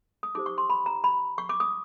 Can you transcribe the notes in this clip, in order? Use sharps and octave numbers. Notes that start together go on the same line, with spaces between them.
D#6
D#4 G4 C5 D6
C#6
C6
B5
A#5
B5
C#6
D6
D#6